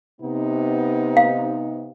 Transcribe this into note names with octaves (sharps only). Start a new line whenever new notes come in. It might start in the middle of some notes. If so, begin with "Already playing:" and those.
C3 B3 D#4
F5